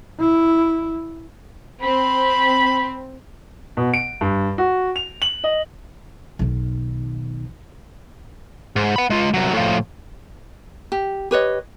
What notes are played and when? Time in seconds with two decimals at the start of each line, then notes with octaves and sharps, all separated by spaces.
0.19 E4
1.82 C4 B5
3.77 B2
3.94 D7
4.21 G2
4.58 F#4
4.96 F7
5.22 F#7
5.44 D#5
6.39 B1 D#3
8.76 G#2
8.96 F#5 B5
9.10 G#3 F4
9.34 C2 F#3
9.53 A2 F3
10.92 G4
11.31 G4 B4 C#5 D#5